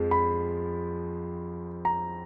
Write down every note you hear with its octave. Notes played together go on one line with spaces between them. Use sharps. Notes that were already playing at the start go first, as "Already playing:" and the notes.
Already playing: F2 F3 G#3
B5
A#5